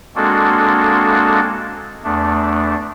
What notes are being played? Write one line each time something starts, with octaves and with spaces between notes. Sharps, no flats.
G#3 A#3 C4 D4 F#4 A4
E2 A3 D4